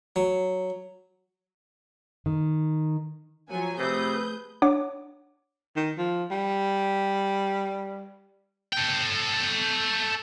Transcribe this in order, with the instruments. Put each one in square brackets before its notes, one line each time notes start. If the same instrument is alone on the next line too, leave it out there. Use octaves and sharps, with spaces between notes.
[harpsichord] F#3
[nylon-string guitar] D#3
[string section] F3 F#3 G#5
[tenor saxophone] C3 [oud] A3 E5 [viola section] G#4 B4 [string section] D#6 G6
[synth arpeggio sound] D4 C#5 F#5 D6
[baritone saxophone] D#3
F3
G3
[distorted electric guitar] A4 G5